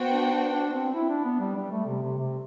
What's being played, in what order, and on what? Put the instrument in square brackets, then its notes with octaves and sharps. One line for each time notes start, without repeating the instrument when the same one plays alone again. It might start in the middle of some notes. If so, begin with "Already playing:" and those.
Already playing: [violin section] B3 F#4 C5 G5
[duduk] D4
D4
D4
C4
E4
D4
B3
G3
G3
A3
C3
C3
C3